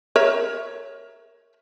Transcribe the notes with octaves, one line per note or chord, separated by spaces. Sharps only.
A#4 C#5 E5